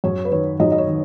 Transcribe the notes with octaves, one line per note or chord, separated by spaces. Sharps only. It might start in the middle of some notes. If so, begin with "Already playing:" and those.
F#2 C#5
B4
D#3 C#5
F#2 D#4 D#5
D#5
C#5
D#3